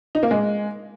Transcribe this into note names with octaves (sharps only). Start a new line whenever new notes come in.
D#4
A#3
G#3